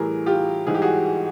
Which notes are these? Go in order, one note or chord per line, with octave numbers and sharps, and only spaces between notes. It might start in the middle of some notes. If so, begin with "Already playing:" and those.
Already playing: A2 E3 G3 G#4 A#4
F4 G4
G#2 E3 G3 G#4
G4
F#4 G#4